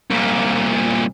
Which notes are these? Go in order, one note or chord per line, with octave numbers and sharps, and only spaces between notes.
C2 A#2